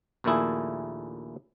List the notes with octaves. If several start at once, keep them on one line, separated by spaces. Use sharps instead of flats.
A#1 D#2 A#2 A3 E4 G#4